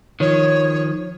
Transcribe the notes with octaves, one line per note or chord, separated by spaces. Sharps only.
D#3 F3 C#5